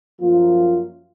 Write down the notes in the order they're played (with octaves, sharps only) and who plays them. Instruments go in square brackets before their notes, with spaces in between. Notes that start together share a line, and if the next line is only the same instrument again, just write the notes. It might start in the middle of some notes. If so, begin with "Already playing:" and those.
[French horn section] F#2 F3 A#3 F4